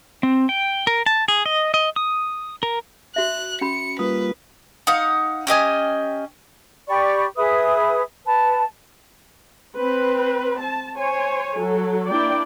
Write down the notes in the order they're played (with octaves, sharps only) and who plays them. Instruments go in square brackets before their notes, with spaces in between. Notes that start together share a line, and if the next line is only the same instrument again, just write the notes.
[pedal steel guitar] C4
G5
A#4
A5
G#4
D#5
D#5
D#6
A#4
[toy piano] F#4 E5 [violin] F#6
[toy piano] C#4 F#4 B5 [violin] C#7
[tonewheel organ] G3 A#3 F4 [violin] B4 [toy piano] D#6
[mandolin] D#4 F5 F#5
C#4 G4 D#5 G#5
[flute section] G4 D5 B5 C#6
G#4 B4 E5 D#6
B4 A5
[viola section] C4 B4
A5
C5 C#5 G#5
F#3 A4
A#3 D4 E4 D5 G5